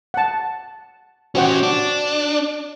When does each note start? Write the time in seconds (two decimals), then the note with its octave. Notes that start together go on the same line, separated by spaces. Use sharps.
0.14 F#5 A5
1.35 C#4 F#4 G4 C5 F#5
1.63 D4